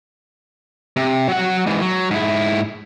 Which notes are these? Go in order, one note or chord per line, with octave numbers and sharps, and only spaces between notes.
C3
F#3 F#5
G#2 E3
F#3
G#2 E4